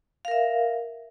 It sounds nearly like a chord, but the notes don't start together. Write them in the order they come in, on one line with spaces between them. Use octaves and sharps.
F5 A#4 E5